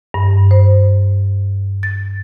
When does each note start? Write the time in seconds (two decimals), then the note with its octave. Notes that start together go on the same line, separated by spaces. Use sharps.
0.14 G2
0.51 C5
1.83 A6